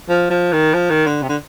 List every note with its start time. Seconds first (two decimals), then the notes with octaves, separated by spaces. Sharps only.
0.09 F3
0.30 F3
0.53 D#3
0.74 F3
0.90 D#3
1.07 D3
1.23 C3
1.29 D3